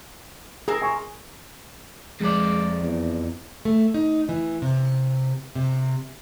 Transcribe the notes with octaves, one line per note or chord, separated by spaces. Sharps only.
C4 G#4 A#4
G#5 C#6
F2 G#3 D5
E2
A3
D#4
E3
C3
C3